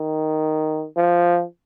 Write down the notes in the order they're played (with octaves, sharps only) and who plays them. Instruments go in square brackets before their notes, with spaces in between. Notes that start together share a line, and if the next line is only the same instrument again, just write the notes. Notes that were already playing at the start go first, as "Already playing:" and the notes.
Already playing: [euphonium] D#3
F3